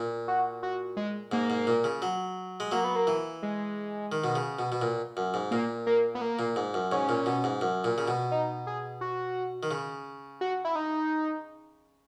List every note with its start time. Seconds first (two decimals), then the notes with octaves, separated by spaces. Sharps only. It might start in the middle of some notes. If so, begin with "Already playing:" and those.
Already playing: A#2
0.28 F#4
0.63 F#4
0.97 G#3
1.32 G#2 A#3
1.50 G#2
1.67 A#2
1.84 C#3
2.02 F#3
2.60 G#3
2.72 F#3 A#3
2.84 B3
2.95 A#3
3.07 E3
3.43 G#3
4.12 D#3
4.24 B2
4.36 C#3
4.59 B2
4.72 B2
4.82 A#2
5.17 F#2
5.34 G#2
5.51 A#2 A#3
5.87 A#3
6.15 B3
6.21 A#3
6.39 A#2
6.56 G#2
6.74 F#2
6.92 G#2 C#4
7.09 A#2
7.26 B2
7.44 G#2
7.61 F#2
7.84 A#2
7.98 C#3
8.08 B2
8.31 D#4
8.67 G#4
9.01 F#4
9.63 D#3
9.71 C#3
10.41 F#4
10.65 E4
10.75 D#4